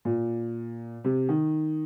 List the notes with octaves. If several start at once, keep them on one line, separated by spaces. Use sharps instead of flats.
A#2
C3
D#3